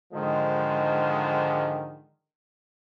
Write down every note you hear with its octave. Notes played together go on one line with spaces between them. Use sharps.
G#2 D3 D#3 F3 G#3